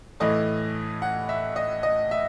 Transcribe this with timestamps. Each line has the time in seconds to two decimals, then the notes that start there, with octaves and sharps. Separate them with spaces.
0.20 A2 E3 A3 D#5
1.02 F#5
1.29 E5
1.56 D#5
1.83 D#5
2.11 E5